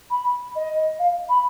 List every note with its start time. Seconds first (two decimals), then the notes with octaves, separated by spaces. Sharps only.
0.10 B5
0.56 D#5
0.99 F5
1.29 B5